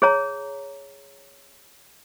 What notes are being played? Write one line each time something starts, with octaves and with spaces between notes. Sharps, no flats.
G#4 C#5 A#5